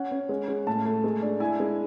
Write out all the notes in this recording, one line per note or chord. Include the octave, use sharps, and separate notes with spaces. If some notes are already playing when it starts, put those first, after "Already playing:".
Already playing: C#4 F#5
C#4
G#3
G#3
A2 A5
A3
G#3
D4
E4 G#5
G#3